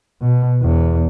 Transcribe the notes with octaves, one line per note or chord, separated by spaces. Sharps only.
B2
E2